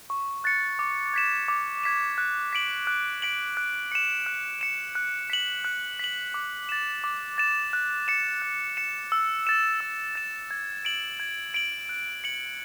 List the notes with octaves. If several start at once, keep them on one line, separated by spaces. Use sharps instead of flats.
C#6
F#6 A6 C#7
D6
G#6 B6 E7
D6
G#6 B6 E7
F#6
B6 D7 F#7
F#6
B6 D7 F#7
F#6
C#7 E7
F#6
C#7 E7
F#6
B6 F#7
F#6
B6 F#7
D6
A6 E7
D6
A6 E7
F#6
C#7 E7
F#6
C#7 E7
E6
A6 E7
E6
A6 E7
G#6
D7 F#7
G#6
D7 F#7
F#6
C#7 F#7